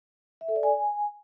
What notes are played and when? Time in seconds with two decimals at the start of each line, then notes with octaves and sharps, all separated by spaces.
0.41 E5
0.48 A4
0.56 D5
0.63 G#5